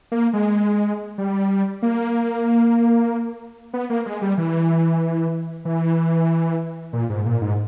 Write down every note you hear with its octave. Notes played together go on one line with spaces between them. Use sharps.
A#3
G#3
G3
A#3
B3
A#3
G#3
G3
E3
E3
A#2
G#2
A#2
G#2